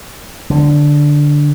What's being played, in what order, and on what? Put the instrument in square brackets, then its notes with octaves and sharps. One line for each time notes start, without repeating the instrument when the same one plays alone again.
[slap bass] D3